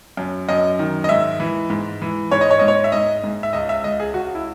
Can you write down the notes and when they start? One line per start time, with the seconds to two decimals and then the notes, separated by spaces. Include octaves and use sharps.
0.17 F#2
0.48 F#2 D#5
0.79 D#3
1.04 D#5
1.09 G#2 E5
1.40 E3
1.70 G#2
2.02 E3
2.31 G#2 C#5
2.41 D#5
2.51 C#5
2.59 G#2 D#5
2.68 C#5
2.84 E5
2.92 G#2 D#5
3.24 G#2
3.43 E5
3.53 C#2 D#5
3.69 E5
3.84 C#2 D#5
4.00 G#4
4.14 C#2 F#4
4.35 E4